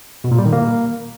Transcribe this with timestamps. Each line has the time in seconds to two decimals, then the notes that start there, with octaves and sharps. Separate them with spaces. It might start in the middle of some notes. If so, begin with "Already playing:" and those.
0.24 B2
0.31 A#2
0.38 G3
0.45 D#3
0.53 A#3